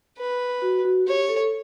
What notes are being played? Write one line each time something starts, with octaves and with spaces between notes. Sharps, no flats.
B4
F#4
F#4
G4 C#5
A4